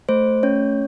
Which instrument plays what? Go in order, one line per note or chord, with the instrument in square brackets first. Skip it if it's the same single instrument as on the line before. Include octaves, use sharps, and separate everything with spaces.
[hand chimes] A3 C5
C#4 C#5